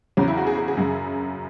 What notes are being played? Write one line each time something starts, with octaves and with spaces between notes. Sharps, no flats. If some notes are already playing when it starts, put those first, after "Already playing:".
E2 C#3 F#3 C#4
E4
F#4
G#4
G#4
G#4
F#2 C#3 F#3